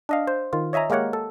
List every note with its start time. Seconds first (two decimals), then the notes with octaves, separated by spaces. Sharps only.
0.09 D4 D#5 F5
0.27 C5
0.53 D#3 F4
0.73 C#5 D#5 E5 G#5 A#5
0.90 G#3 A#3 G4 A#4 C#5 F#5
1.13 A4